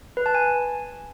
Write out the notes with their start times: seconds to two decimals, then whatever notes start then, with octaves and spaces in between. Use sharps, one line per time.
0.17 B4
0.26 A5
0.35 G#5